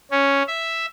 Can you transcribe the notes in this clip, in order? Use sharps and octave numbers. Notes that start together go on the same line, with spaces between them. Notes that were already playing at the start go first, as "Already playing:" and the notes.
C#4
E5